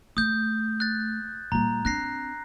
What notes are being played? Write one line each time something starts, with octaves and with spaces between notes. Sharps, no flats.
A3 D#6 G6
F#6 A6
A#2 G3 A#5
C4 D4 F#6 A#6 C7